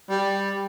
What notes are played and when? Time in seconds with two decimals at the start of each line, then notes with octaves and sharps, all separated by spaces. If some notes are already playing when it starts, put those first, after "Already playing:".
0.10 G3